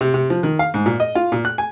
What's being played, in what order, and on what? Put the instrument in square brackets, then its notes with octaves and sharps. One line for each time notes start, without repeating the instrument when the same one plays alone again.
[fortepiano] C3
C3
F3
D#3
F5
G#2
A#2
D#5
F4
A#2
F#6
G#5